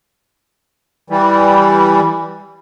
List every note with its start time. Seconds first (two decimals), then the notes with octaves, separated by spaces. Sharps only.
1.10 E3 G3